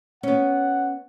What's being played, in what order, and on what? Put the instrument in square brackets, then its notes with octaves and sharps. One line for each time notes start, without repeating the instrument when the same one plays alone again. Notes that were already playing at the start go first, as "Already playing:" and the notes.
[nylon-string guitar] B3 C#4 [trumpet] F#5